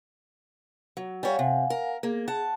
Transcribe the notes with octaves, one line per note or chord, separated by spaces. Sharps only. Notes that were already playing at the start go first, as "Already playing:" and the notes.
F#3
G3 C#5 F5 F#5 G#5
C3
A#4
A#3 G#4
F#5 A5